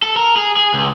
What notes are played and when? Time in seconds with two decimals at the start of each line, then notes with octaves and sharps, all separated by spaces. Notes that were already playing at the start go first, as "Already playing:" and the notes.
0.02 A4
0.17 A#4
0.36 G#4
0.57 G#4
0.74 C#2